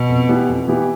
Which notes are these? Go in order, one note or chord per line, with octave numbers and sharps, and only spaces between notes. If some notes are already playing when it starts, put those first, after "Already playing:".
Already playing: B2
F2
E3 B3 E4 G4
F2
E3 B3 E4 G4